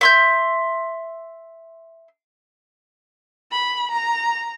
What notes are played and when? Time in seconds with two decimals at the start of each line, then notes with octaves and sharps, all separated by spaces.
0.01 E5 C6 G6
3.52 B5
3.91 A#5